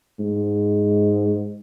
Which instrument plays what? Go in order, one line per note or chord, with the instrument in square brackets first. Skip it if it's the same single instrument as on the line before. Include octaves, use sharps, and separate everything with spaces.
[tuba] G#2